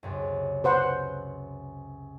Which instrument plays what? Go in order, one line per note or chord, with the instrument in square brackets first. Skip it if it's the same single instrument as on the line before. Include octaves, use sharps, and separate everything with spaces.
[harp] C#2 F#2 C3
[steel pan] B4 C5 F#5